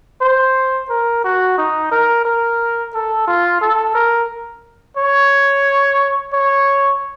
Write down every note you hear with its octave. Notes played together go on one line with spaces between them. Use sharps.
C5
A#4
F#4
D#4
A#4
A#4
A4
F4
A4
A#4
C#5
C#5